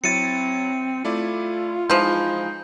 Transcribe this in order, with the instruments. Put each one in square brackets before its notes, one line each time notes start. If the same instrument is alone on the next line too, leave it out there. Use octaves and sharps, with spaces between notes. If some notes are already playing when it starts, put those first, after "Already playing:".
[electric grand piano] F#3 E4 A6 [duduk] C4 [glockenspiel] C#7 D#7
[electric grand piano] A3 E4 D5 [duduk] F4
[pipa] E3 F3 [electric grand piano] G#3 D#4 [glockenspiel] G6